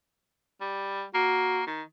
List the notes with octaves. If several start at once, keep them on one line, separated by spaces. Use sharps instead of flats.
G3
A#3 F#4
D#3